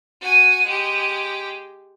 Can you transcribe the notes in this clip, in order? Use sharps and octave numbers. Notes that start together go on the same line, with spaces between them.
F#4 G#5
G#3 G4